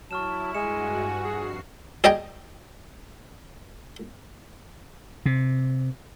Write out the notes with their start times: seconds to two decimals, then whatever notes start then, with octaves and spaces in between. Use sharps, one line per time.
0.11 F#3 E4 A5 C#6 F6 E7
0.54 G2 G#3 F#4 G#5 C#7 E7
1.24 F2 G#4 C7
2.04 G#4 D5 D#5 G5 A#5
5.26 C3